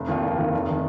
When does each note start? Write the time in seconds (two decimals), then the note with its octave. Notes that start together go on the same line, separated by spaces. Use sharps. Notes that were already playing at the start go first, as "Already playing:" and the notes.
Already playing: F1
0.08 D#2 D#3 A#3 F4
0.24 F1
0.38 D#2 D#3 A#3 F4
0.53 F1
0.70 D#3